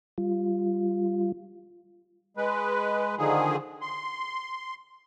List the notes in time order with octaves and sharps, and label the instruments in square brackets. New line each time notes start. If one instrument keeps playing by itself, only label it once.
[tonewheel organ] G3 F4
[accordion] G#3 B4
D3 D#3 F3 G#4
C6